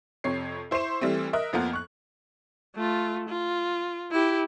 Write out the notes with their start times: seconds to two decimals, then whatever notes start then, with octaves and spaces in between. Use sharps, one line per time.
0.24 F2 C3 C#5 C7
0.71 E4 C5 C#6 C7 E7
1.01 E3 G3 A3 C4
1.33 A#4 D#5 E5 F#6
1.53 F2 F3 A#3 B3 F6
1.73 C#6 F#6
2.76 A3 F4
3.29 F4
4.12 E4 G4